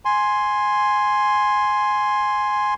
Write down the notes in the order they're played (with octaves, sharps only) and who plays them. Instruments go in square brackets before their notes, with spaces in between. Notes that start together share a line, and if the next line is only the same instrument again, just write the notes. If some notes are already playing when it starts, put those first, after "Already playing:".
[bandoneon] G#5 C6